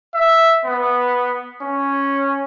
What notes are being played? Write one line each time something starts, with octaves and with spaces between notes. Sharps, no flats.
E5
B3
C#4